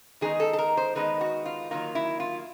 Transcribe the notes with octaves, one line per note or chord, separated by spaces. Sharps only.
D#3 G#3 B3 D#4 G#4
A4
A4
A#4
C5
D#3 G#3 B3 D#4 B4
F#4
F4
D#3 F#3 A#3 F4
E4
F4